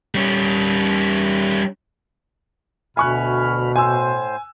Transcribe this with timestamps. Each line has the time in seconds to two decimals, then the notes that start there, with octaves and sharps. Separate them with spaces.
0.15 G3 C#4
2.97 D2 B2 G#5 B5 C#6 F6 F#6
3.76 A2 C5 G#5 E6